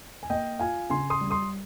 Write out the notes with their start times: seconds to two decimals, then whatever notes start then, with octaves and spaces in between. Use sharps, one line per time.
0.23 G#5
0.29 A#3 D#5 G5
0.59 F4 F5 G#5
0.90 C#3 G#5 C6
1.10 C6 D#6
1.21 G3
1.30 C6 D#6